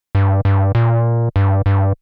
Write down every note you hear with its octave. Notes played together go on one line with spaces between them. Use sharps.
G2
G2
A#2
G2
G2